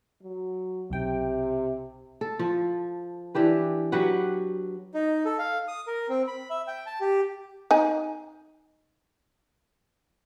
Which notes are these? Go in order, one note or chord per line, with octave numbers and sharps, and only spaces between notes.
F#3
B1 C3 G5
A4
F3
E3 D4 G4 B4
F#3 G4 B4 F#5
D#4
A4
F5
D#6
A#4
C4
B5
E5
G5
A5
G4
D#4 G#5